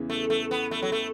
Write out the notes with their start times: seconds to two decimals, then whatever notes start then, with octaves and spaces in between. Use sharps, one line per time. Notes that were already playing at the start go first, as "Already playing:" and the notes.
Already playing: E2 C#3 E3
0.10 A3
0.30 A3
0.51 B3
0.71 A3
0.82 F#3
0.92 A3